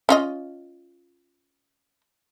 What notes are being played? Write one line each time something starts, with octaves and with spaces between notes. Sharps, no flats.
C#4 F4 D#5